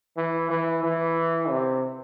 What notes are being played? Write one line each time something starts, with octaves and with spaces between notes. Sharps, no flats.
E3
E3
E3
C3